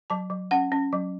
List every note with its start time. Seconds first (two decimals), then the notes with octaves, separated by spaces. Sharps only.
0.10 F#3 A5
0.30 F#3
0.51 C#4 F#5
0.72 C#4
0.93 F#3